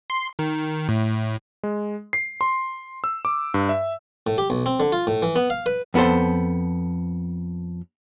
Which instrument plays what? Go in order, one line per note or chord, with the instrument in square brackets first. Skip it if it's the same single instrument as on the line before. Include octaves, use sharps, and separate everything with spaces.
[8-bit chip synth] C6
D#3
A2
[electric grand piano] G#3
C7
C6
E6
D6
G2
E5
[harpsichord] A2
G4
B1
C4
D3
F4
A2
E3
B3
F5
B4
[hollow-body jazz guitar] F2 B3 E4 A4 C5